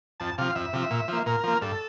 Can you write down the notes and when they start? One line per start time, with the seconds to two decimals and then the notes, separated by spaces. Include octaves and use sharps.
0.20 F2 A5
0.38 C3 F3 F5
0.55 F2 E5
0.73 C3 F3
0.91 A#2
1.08 F3 A#3
1.26 A#2 A#4
1.44 F3 A#3
1.62 G2 A4